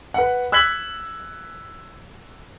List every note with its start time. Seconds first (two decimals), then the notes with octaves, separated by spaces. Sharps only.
0.14 B4 F#5
0.52 E6 F#6 G#6 B6 F#7